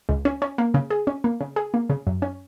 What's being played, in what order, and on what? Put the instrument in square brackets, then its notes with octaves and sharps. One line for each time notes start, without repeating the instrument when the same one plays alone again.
[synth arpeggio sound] C#2
C#4
C#4
A#3
C#3
G#4
C#4
A#3
C#3
G#4
A#3
C#3
F#2
C#4